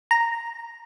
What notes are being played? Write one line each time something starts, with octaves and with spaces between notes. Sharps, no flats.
A#5